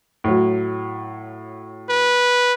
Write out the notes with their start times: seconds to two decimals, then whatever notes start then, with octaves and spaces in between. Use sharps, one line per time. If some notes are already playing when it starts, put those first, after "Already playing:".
0.24 A2 F#3
1.90 B4